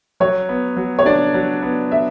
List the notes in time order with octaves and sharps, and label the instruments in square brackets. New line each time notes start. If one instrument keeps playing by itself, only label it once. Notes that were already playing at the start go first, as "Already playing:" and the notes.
[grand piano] F#3 [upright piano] C#5
[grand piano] B3
F#3
[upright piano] C#5
[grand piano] D4 [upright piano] D5
[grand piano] F#3
B3
[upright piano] E5